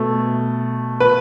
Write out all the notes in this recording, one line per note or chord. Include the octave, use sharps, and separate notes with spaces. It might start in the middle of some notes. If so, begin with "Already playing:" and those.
Already playing: B2 A3
B4